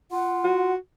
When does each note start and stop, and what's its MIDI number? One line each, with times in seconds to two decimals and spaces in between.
0.12 0.73 65
0.12 0.73 78
0.44 0.76 66